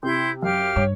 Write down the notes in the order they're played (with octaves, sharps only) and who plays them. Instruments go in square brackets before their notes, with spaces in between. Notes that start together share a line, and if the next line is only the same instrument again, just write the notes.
[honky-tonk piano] C3 [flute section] E4 C6 G6
[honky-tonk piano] F#2 [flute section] G4 F5 F6
[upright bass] G2 [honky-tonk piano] C#5